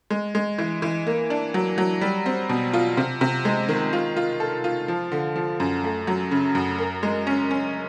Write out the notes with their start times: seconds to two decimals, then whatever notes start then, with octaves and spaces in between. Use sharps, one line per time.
0.10 G#3
0.35 G#3
0.58 E3
0.82 E3
1.07 A#3
1.30 D4
1.54 F#3
1.78 F#3
2.01 G3
2.26 C4
2.49 B2
2.73 F4
2.97 C3
3.21 C3
3.45 G#3
3.69 D#3
3.93 F4
4.17 F4
4.40 A4
4.64 F4
4.88 F3
5.12 D3
5.36 F3
5.60 F#2
5.84 A3
6.07 F#3
6.31 C#3
6.55 F#2
6.79 A#4
7.03 G#3
7.27 C#4
7.51 C#4